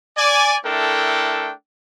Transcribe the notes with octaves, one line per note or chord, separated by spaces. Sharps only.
D5 G#5
A3 D4 E4 A4 A#4 G5